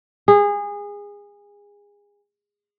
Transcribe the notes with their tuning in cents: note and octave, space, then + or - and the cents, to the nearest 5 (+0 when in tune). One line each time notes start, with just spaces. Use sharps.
G#4 -25